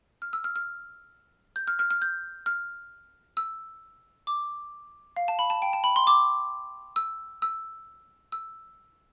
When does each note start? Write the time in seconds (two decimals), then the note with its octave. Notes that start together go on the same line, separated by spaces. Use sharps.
0.22 F6
0.33 E6
0.44 F6
0.56 F6
1.56 G6
1.68 F6
1.79 F6
1.91 F6
2.02 G6
2.46 F6
3.37 E6
4.27 D6
5.17 F5
5.28 A5
5.39 B5
5.50 A5
5.62 G5
5.73 A5
5.84 B5
5.96 C6
6.07 D6
6.96 E6
7.42 E6
8.32 E6